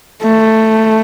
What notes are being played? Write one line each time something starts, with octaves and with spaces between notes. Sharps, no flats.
A3